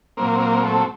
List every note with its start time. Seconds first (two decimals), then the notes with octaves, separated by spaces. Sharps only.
0.17 A#2 F#3 A#3 C4 A#4
0.40 A#3 A#4
0.63 A3 A4